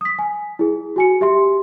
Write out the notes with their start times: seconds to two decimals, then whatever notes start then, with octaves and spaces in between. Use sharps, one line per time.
0.01 D#6 B6
0.19 G#5
0.59 E4 G#4
0.96 F#4 G#5 C#7
1.21 G4 E5 C6